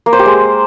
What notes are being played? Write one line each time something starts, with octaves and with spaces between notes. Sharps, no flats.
A#3
C5
G4
G#3